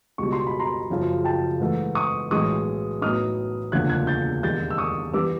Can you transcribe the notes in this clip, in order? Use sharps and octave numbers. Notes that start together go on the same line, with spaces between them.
C#2 B2 G3 C#6
C6
B5
A#5 C6
F#1 F#2 C#3 F3
G5 A5
G#2 E3 A3
C#6 D#6
B1 A2 E3 G#3 C#4 C#6 D#6
A2 F#3 B3 D#4 D#6 F6
E1 D2 C#3 F3 A#3 F#6 G#6
F#6 G#6
G6 A6
E1 D#2 D#3 G3 G6 A6
E6
C#6 D#6
E3 G3 B3 D6 E6